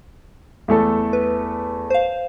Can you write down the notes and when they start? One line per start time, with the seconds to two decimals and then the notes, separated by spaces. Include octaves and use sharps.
0.68 E2 A3 A4
1.13 B4
1.90 C5 F5